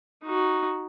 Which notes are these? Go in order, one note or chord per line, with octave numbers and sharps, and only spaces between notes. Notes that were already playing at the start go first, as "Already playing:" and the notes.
D#4 F#4